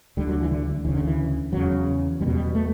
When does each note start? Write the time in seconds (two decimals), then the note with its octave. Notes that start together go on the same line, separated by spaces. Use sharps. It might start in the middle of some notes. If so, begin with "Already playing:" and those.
0.17 D2 D3 G3
0.29 F#3
0.41 E3
0.51 D3
0.85 D2 C#3 E3
0.94 D3
1.04 E3
1.52 E2 C#3 F#3
2.20 E2 G3
2.25 B2 F#3
2.35 G3
2.55 A3